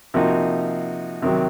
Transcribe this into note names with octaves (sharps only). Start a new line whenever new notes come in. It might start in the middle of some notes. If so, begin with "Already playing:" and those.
C3 F3 A#3 D#4 F#4
C3 D#3 F#3